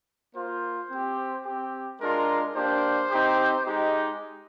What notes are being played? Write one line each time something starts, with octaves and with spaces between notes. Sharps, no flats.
A#3 F4 C5
C4 G4
C4 G4
G#3 D4 F4 A#4
A#3 D4 G4 C5
C4 D#4 G4
G#3 D#4 G4